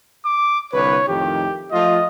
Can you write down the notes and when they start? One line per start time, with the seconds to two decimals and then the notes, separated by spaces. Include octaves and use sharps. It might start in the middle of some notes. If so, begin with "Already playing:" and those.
0.25 D6
0.73 C2 D3 B4 C#5
1.08 F2 A2 D#3 G4
1.72 F3 A3 F4 D#5